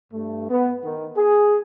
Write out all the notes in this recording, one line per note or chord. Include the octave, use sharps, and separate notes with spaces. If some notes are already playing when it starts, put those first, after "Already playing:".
G2 A3
B3
D#3
G#4